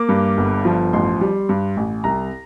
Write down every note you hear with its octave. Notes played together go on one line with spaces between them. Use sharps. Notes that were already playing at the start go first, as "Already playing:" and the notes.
Already playing: A#3 D6
G2
G1
F3
A1 C6
G3
G2
A1
C2 A#5